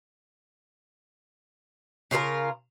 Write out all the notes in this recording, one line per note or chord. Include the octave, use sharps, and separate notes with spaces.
C#3 F4 G#4 A#4